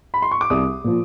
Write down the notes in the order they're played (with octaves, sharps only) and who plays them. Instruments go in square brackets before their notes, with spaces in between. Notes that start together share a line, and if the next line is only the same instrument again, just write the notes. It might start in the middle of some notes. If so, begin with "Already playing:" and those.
[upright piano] B5
C6
C#6
D6
C2 D#6
A#2 F3